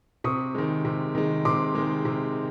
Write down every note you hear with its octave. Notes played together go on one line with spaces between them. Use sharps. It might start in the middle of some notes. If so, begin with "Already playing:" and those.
C3 C#6 D#6
D#3 G#3
C3
D#3 G#3
C3 C6 D6
D#3 G#3
C3